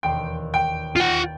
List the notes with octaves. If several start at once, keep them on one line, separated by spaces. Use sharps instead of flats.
E1 D#2 G5 C6
G5
F4 F#5